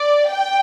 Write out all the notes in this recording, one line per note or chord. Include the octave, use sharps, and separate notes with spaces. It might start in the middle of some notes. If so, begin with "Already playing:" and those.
Already playing: D5
G5